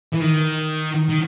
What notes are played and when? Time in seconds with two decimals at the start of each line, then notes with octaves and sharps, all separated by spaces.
0.13 E3
0.20 D#3
1.10 D#3